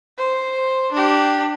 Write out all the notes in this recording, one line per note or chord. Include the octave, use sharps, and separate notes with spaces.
C5
D4 G4